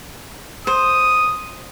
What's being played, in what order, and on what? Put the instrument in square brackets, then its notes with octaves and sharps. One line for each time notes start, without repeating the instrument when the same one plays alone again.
[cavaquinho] C5 [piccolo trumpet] D#6